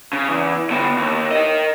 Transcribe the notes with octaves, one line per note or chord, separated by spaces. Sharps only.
C#3
E2
D3 B3
D#2
A#4 D#5